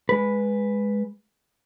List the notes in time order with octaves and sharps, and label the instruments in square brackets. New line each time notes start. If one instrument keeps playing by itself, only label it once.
[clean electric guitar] G#3 B4